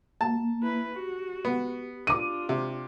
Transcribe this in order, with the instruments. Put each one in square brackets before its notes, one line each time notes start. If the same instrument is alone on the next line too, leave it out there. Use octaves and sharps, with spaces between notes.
[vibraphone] A#3 [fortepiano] A5
[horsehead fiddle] E4 B4
[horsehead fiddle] F#4 [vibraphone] G4
[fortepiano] B3
[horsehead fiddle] D4 F4 [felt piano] D6 D#7
[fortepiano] C3